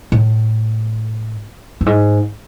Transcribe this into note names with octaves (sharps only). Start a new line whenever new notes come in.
A2
G2
G#2